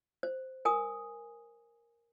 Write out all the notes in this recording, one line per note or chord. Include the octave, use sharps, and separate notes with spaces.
C5
A#4 G#5 D#6